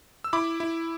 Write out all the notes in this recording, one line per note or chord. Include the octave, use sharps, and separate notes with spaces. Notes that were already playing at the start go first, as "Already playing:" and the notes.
E6
E4 B5 D6
E4